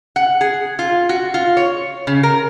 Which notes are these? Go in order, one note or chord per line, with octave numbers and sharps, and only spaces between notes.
F#5
G#4
F4
F#4
F4
C#5
C#3
A#4